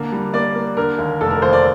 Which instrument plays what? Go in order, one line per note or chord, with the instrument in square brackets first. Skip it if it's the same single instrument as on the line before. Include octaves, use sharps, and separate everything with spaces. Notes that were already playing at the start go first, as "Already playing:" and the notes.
Already playing: [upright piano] D3 A#3
G3
A#3 D5
A#3
D3 A#4
D#2
F1 A4
A#4
D#2 C5
D5